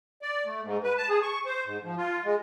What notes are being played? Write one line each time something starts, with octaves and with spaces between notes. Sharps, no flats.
D5
A3
G#2
B4
A5
G#4
C#6
C5
G#2
F3
F4
G#3